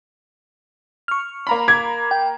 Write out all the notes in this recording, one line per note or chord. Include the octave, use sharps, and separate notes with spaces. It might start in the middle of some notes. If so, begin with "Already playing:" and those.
C#6 F6
A#3 A#5 B5
D6 G#6
G5